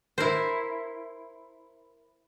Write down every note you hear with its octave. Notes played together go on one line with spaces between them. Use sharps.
E4 A#4 C5